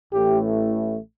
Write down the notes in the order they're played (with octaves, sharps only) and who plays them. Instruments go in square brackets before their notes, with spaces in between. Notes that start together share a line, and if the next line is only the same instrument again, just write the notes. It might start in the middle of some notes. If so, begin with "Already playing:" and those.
[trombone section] A1 A2 E3 A3 G4